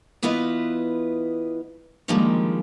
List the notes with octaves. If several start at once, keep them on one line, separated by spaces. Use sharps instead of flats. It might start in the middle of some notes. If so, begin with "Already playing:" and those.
E3 B3 E4 F4 B4 D#5
D3 D#3 F3 G3 G#3 A#3